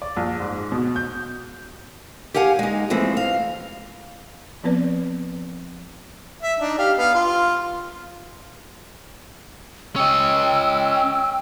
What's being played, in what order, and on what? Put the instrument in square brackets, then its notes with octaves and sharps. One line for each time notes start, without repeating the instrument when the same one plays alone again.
[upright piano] D5
A#1
G#2
B2
G6
[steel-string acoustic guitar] G4 G#4 F5 F#5 G#5
G#3 D#4
E3 F3 G#3 A3 C4
F5
[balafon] F3 B3 C4 B4 D5
[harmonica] E5
D4 D#4
G4 F5
B3 F5
F4
[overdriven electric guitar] C#4 D#5 [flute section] G5 E6